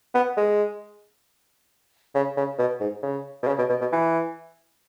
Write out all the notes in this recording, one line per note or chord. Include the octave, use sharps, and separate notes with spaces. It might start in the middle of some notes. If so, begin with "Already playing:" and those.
B3
G#3
C#3
C#3
B2
G#2
C#3
B2
C#3
B2
B2
B2
E3